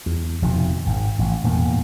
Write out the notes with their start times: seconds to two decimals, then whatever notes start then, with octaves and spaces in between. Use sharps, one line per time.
0.06 E2
0.42 F1 F2 B2 D#3
0.86 G#1 G#2
1.19 A1
1.44 D#1 E2 G#2 A#3